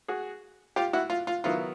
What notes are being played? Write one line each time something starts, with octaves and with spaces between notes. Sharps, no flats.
F#4 G#4
F4 G4
E4 F#4
F4
F4
D#3 F#3 B3 E4 F4